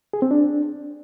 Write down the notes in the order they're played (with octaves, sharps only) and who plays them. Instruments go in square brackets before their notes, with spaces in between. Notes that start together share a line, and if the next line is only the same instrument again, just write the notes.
[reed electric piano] G#4
C4
D4